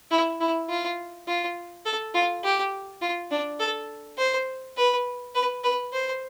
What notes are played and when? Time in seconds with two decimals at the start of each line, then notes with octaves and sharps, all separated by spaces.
0.11 E4
0.40 E4
0.69 F4
1.27 F4
1.85 A4
2.14 F4
2.43 G4
3.01 F4
3.31 D4
3.60 A4
4.17 C5
4.77 B4
5.35 B4
5.64 B4
5.93 C5